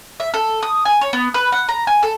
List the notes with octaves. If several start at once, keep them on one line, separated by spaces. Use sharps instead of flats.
E5
A4
D#6
G#5
C#5
B3
B4
F#5
A#5
G#5
A4